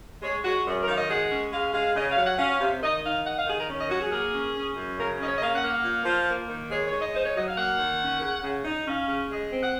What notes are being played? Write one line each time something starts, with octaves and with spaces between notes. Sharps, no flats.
G#3 C#5
G#3 F#4
F#2 G#4
A#4
D#3 F5
D#5
G#3 F#5
C#4
G#3 F5
G#3 F5
C#3 D#5
F5
F#3
F#5
C#4 F5
C3
D#3 D#5
D#4 F5
D#4 F#5
F5
D#3 G#4
A#4
C#4
D#5
F#3 F#4
G#4
A#3 G#4
C#4
C#4
F#2
C#3 A#4
C#4 D#5
C#5
D#5
A#3 F5
F#5
A#3
F5
A#2
F3
A#3
D#3
G#3 C#5
C#5
G#3
D#5
D#4 C5
C#5
F#3 D#5
F5
A#3 F#5
D#3
C#4
C#3
C#3
D#4
C#4 F5
C#3
G#3 D#5
C4
F#5